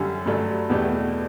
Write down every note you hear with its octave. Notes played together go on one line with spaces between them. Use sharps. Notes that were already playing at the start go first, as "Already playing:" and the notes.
Already playing: F#2 D3 G3 C#4 G4
G2 F#3 A3 D4 A4
E2 B2 A3 D4 G4